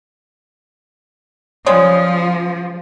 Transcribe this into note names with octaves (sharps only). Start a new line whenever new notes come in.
C#3 F3 G3 G#3